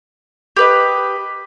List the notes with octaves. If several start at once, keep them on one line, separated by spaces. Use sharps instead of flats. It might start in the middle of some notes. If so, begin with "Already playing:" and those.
G4 B4 D#5